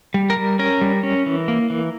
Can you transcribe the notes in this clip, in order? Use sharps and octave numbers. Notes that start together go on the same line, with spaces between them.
G3
A#4
G3
C#4 A#4
G3
C#4
E3
A#3
E3